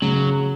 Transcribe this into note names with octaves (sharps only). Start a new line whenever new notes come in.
C#3 F#3